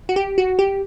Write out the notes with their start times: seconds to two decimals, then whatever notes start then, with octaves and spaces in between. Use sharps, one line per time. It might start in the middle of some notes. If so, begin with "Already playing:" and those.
0.09 F#4
0.16 G4
0.38 F#4
0.59 G4